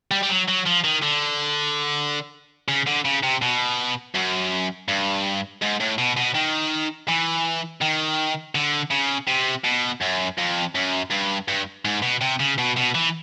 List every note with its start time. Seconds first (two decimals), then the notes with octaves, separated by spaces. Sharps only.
0.11 G3
0.23 G3
0.29 F#3
0.48 F#3
0.66 F3
0.84 D#3
1.02 D3
2.68 C#3
2.87 D3
3.05 C#3
3.23 C3
3.42 B2
4.15 F#2
4.88 G2
5.62 G#2
5.80 A2
5.98 B2
6.17 B2
6.35 D#3
7.09 E3
7.82 D#3
8.55 D3
8.91 C#3
9.28 C3
9.65 B2
10.02 F#2
10.38 F2
10.75 F#2
11.11 G2
11.48 G2
11.85 G#2
12.02 B2
12.21 C3
12.40 C#3
12.58 B2
12.77 B2
12.95 E3